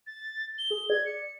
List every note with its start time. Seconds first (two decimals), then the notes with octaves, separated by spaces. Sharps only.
0.07 A6
0.58 G7
0.70 G#4
0.90 D5 G#6
1.06 C#7